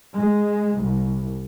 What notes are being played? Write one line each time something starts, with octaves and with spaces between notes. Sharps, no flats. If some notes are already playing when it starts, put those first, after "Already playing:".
G#3
C2